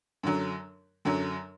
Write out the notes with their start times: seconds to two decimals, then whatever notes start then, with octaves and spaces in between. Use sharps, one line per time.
0.23 F#2 D3 F#3
1.05 F#2 D3 F#3